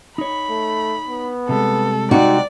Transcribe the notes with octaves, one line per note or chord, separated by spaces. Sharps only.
D#4 C#5 B5
A3
B3
C3 G3 G#3 A4
C4 D#4 F#4 D5